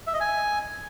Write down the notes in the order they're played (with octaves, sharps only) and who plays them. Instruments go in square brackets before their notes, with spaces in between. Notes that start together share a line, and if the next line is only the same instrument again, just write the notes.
[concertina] E5
D#5
G#5